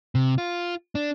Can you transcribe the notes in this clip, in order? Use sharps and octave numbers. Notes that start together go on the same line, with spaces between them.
C3
F4
D4